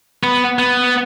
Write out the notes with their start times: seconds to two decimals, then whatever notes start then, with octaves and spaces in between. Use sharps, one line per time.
0.24 B3
0.59 B3